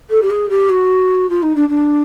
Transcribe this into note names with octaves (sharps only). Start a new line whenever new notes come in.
A4
G4
G#4
G4
F#4
F4
D#4
D4
D4